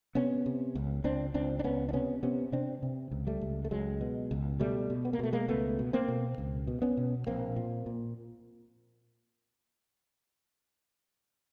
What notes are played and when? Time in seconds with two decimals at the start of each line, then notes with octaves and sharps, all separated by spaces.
0.15 C3 B3 C#4
0.46 C3
0.75 C#2
1.04 C#2 C4 D4
1.34 C#2 C4 D4
1.59 D4
1.64 C#2 B3 C#4
1.89 D4
1.93 C3 B3 C#4
2.23 C3 B3 C#4
2.52 C3 C4 D4
2.83 C3
3.11 C#2
3.27 G3 A3
3.41 C#2
3.65 A3
3.71 C#2 F#3 G#3
4.01 B2
4.31 C#2
4.60 B2 G3 A3
4.90 B2
5.05 B3
5.13 A#3
5.19 B2 A3
5.33 G#3 A#3
5.48 C#2 A3 B3
5.79 B2
5.93 A#3 C4
6.08 B2
6.38 C#2
6.67 B2
6.82 B3 C#4
6.97 B2
7.27 A#1 A#3 C4
7.56 A#2
7.86 A#2